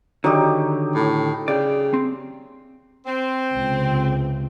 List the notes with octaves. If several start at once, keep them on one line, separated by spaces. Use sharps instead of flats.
D3 D#3 F#3 D#4 G4
A2
C#3 D5 G5
C4
C4
C#2 C3